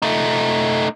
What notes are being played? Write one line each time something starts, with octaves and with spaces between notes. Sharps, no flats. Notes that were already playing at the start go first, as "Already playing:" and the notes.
A3 D#4